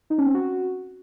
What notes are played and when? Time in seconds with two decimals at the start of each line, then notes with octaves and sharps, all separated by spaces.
0.10 D#4
0.18 C#4
0.26 C4
0.34 F#4